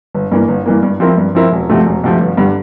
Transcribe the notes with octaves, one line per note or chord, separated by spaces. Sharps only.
G1
G2 E3 A#3
G1
G2 E3 A#3
G2
F3 C4 E4 A#4
G2
F3 C4 E4 A#4
E1
D2 C3 F3 A3
E1
D2 C3 F3 A3
G1
G2 D3 G3